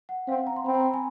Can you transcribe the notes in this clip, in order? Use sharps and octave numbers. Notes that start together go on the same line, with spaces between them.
F#5
C4 F5
A#5
C6
C4 B5
A#5
G#5